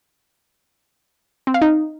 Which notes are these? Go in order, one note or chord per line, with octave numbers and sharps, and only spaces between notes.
C4
F5
D#4